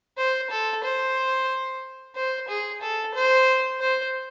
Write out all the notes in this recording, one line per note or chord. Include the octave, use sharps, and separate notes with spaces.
C5
A4
C5
C5
G#4
A4
C5
C5